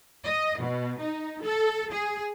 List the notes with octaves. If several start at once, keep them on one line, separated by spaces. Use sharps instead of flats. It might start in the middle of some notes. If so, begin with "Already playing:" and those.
D#5
B2
D#4
A4
G#4